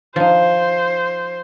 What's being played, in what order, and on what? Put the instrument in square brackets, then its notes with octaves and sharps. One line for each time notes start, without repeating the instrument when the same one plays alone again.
[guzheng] F3 D#4 [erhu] C5